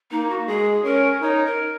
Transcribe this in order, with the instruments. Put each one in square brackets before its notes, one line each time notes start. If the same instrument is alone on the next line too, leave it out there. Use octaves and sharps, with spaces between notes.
[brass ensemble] A#3 [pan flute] D#4
[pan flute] F#4
[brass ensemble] G#3 [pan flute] G#4
[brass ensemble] C#4 [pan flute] A#4
[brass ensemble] D#4 [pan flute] C#5
[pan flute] A#4